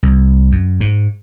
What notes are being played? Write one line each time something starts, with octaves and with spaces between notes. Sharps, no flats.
C2
F#2
G#2